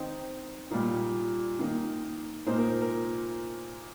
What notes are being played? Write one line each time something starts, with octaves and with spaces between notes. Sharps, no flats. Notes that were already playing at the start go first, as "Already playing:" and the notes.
Already playing: D#3 C4 D#4
A#2 G3 A#3 D#4
D#3 A#3 D#4
A#2 A#3 D#4 C5
A#4
A#4